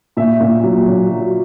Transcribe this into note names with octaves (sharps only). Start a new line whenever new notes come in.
A#2 E5
A#2
F#3
F#3
F#3